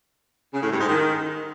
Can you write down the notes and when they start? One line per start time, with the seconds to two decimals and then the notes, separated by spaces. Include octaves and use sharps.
0.53 C#3
0.62 A2
0.71 G2
0.80 G#2
0.89 D#3